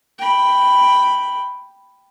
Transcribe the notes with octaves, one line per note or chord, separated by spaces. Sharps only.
G5 B5